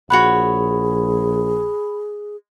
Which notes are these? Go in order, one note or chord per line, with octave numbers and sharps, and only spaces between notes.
A#1 F#4 G#4 C#5 F#5 B5